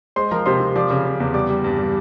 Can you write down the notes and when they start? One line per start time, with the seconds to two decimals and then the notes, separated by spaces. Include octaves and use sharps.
0.16 G#3 C5 C6
0.31 F3 A#4 A#5
0.46 C3 C5 C6
0.61 C3
0.76 F3 D5 D6
0.90 C#3
1.05 C#3
1.20 E2
1.34 G3 D5 D6
1.49 G3
1.64 G2
1.79 G3